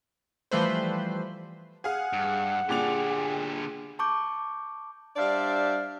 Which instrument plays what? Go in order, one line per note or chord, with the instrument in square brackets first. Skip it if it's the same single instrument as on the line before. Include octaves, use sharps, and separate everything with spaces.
[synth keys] E3 F3 G3 A3 B4 C5
[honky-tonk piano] G#4 F5 [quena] F#5
[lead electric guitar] G2
[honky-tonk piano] A#2 D4 F7 [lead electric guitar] D3 G4 [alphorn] G#4
[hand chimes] A5 C#6 D6 G6
[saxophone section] G3 D4 C5 D5 E5 F5